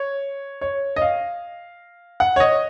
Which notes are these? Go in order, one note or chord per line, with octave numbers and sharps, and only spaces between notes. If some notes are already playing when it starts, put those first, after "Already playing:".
Already playing: C#5
C#5
D#5
F5
F#5
C#5
D#5